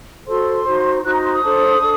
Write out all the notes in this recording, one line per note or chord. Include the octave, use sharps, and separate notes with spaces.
F#4 A4 C5 C6
D#4 F#4 C5
D#4 F#4 C5 F#6
A#5
C6
D#6
D4 A4 C5
D4 A4